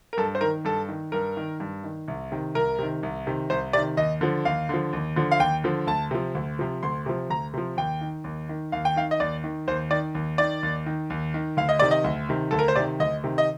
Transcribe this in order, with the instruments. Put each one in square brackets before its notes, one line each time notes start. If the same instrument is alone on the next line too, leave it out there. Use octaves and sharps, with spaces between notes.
[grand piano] A#4
G2 A4
C5
D#3 A#4
G2 A4
D#3
G2 A#4
D#3
G2
D#3
C2
C3 D#3
C2 A#4
C3 D#3
C2
C3 D#3
C2 C5
C3 D#3 D5
D#2 D#5
D3 F3
D#2 F5
D3 F3
D#2
D3 F3
F5
D#2 G5
D3 F3
D2 A5
C3 F3
D2
C3 F3
D2 C6
C3 F3
D2 A#5
C3 F3
D#2 G5
D#3
D#2
D#3
D#2 F5
G5
D#3 F5
D#5
D#2 D5
D#3
D#2 C5
D#3 D5
D#2
D#3 D5
D#2
D#3
D#2
D#3
D2 F5
D#5
C3 D#3 D5
D#5
D2
C3 D#3
D2 A4
A#4
C5
C3 D#3 D5
D2 D#5
C3 D#3
D#5